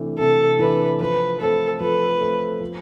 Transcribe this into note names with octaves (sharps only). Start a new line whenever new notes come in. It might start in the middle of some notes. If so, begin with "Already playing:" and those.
Already playing: C3 E3 A3 D4
C3 A4
E3 A3 D4 B4
F3 B4
A3 C4 A4
F3 B4
A3 C4
F3